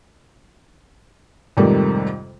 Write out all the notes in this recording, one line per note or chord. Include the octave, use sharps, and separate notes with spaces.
F2 G#2 C3 D#3 G3 A3